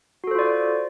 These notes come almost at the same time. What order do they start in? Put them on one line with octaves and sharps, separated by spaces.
F#4 A4 C5 F4 D5